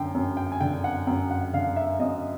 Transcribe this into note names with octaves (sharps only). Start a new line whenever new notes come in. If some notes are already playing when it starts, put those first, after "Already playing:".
Already playing: F#2 D3 G5
F#2
G5
G#5
D3 G5
F#5
F#2 G5
F#5
D3 F5
E5
F#2 D#5